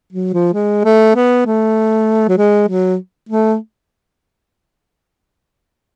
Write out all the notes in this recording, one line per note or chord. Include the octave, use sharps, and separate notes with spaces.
F#3
F3
G#3
A3
B3
A3
F#3
G#3
F#3
A3